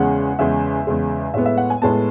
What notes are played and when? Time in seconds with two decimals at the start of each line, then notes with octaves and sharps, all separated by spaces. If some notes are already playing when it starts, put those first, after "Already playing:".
Already playing: E2 C#3 G#3 F#5
0.39 E2 C#3 G#3 E5
0.87 E2 C#3 G#3
1.34 A2 G#3 B3 E5
1.46 E5
1.58 F#5
1.70 G#5
1.82 A2 G#3 B3 A5